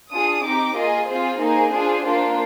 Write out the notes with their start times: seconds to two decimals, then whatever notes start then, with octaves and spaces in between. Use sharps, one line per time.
0.11 D4 F4 G#4 D#6
0.43 C4 D#4 G4 D6
0.75 A#3 F4 G#4 D#5
1.07 C4 F4 G#4 C5
1.40 A#3 D#4 G#4 C5
1.72 D4 F4 G#4
2.04 A#3 D4 F4